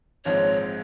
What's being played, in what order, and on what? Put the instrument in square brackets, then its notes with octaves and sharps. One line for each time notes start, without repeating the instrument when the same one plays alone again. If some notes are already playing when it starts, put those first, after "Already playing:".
[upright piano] A#1 G#2 F3 G#3 C4 [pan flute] C#5